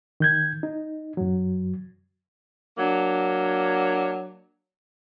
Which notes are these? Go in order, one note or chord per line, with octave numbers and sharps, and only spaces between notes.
D#3 G6 G#6
D#4
F#2 F#3
F#3 A#3 D4